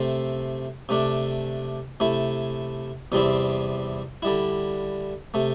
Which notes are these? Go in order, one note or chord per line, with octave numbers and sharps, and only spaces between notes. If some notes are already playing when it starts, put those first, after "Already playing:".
Already playing: C3 A3 C4
C3 A3 D4
C3 A3 E4
E2 C3 G3 C4 E4
D3 G3 E4
C3 A3